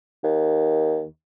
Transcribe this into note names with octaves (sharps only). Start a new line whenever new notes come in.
D#2